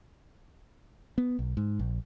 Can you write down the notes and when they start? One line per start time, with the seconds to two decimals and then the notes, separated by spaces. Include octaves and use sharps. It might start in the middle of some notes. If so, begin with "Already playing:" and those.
1.18 B3
1.39 B1
1.57 G#2
1.79 A#1